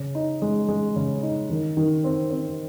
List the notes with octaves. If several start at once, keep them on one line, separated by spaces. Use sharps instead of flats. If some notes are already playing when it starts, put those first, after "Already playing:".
Already playing: C#3
D#4
G#3
G#3
C#3
D#4
D#3
D#3
C4
C4